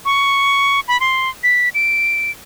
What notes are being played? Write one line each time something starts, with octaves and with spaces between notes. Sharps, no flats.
C#6
B5
C6
B6
D7